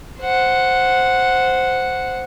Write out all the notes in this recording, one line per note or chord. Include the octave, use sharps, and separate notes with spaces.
C5 F#5